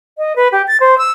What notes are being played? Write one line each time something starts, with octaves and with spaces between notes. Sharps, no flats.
D#5
B4
G4
A6
C5
E6